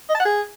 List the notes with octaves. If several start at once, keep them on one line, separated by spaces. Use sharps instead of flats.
D#5
A5
F#5
G#4